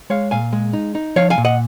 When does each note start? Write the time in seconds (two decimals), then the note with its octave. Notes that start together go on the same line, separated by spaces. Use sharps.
0.10 G#3 C#5 F5
0.31 A#2 F5 G#5
0.53 G#3
0.73 D#4
0.95 D#4
1.16 F3 C#5 F5
1.30 F5 G#5
1.38 A#2
1.45 D#5 F#5